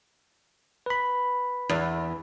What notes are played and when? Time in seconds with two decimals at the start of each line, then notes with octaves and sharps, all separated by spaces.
0.86 B4 B5
1.69 E2